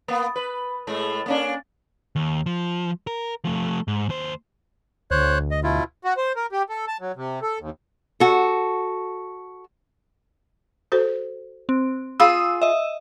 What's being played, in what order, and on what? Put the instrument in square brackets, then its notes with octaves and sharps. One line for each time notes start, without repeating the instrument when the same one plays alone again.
[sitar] A#3 B3
B4
A2 G#3 A3
A#3 C#4 D4
[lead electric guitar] D#2
F3
A#4
F3 A3
G#2
D#2 C5
[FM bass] D2 [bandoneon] C5 C#5 F#6
[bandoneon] D#5
B2 E4 F4
[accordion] F#4
C5
A#4
G4
A4
A5
F#3
C3
A4
D#2
[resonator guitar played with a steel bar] F#4 A4
[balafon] F#4 A4 C5
[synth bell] C4
[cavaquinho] F4 G#4 [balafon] F5 B5 [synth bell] D#6 E6
[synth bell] D#5 E5